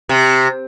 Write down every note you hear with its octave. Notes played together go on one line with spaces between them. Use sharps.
C3